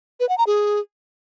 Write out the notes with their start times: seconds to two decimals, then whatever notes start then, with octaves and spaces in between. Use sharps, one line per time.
0.20 B4
0.29 F#5
0.38 A#5
0.47 G#4